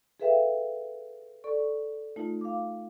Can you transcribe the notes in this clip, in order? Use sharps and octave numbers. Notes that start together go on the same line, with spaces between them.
G#4 A4 B4 E5 F5 G5
A4 D5 C#6
A3 D#4 F4
F5 D6